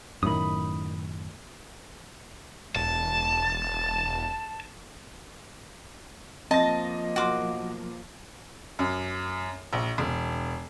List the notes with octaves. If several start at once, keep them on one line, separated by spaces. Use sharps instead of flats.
F#2 A2 D#3 B5 D#6
E1 A5
F3 A#3 C4 D#5 A5 A#6
B1 F#4 A#4 C6 D6
F#2
A#1
E1